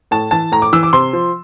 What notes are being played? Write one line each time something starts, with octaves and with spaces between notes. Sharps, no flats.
A2 A5
E3 A5
A2 A#5
D6
E3 E6
D6
C3 C6
F3